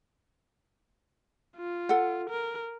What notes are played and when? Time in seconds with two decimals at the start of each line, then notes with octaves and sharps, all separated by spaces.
1.57 F4
1.89 A4 F#5
2.30 A#4